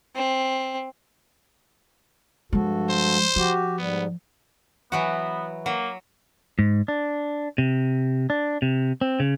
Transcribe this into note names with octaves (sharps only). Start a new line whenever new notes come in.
C4
G2 F3 G#3 F#4 A4
C5
F3 F#4 G4
G#2 G3 B3
E3 F#3 B3 F#4
F#3 A#3
G#2
D4
C3
D4
C3
C4
C#3